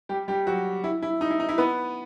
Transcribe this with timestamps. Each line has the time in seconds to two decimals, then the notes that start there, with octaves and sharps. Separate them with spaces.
0.09 G3 G4
0.28 G3 G4
0.47 F#3 F#4
0.84 E4
1.02 E4
1.21 D#4
1.30 E4
1.40 D#4
1.49 E4
1.58 B3 B4